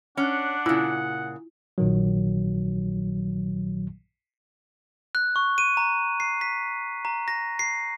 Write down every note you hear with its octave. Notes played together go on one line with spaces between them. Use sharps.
C#4 D4 F#5
A#2 C#3 E4 F4
A#1 A#2 D#3 F#3
F#6
C#6
D#7
A#5
C7
B6
A#5
A#6
C7